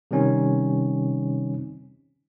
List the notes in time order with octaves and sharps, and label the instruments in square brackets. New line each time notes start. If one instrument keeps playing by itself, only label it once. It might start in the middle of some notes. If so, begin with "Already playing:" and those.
[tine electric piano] C3 D#3 G3 C4 C#4 D#4